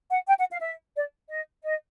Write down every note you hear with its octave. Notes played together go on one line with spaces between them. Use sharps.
F#5
G5
F#5
F5
E5
D5
D#5
D#5